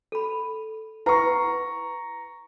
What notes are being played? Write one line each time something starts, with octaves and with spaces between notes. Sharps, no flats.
A4 B5
E4 B4 F#5 A#5 C#6